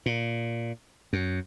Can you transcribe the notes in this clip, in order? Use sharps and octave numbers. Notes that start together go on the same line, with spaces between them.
A#2
F#2